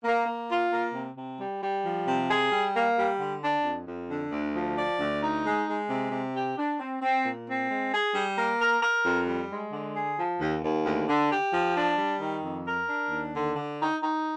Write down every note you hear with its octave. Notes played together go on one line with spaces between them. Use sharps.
A#3
A#3
F4
A#3
C3
C3
G3
G3
F3
C3
G#4
G3
A#3
G3
D3
D4
F2
F2
D3
D2
F3
D5
D2
D#4
G#3
G#3
C3
C3
G4
D4
C4
C4
A#2
C4
G#3
G#4
G3
A#3
A#4
A#4
F2
G3
G#3
D3
G#4
F3
D#2
D#2
D2
D3
G4
F3
D4
G3
D#3
F2
A#4
D4
D#2
D3
D3
D#4
D#4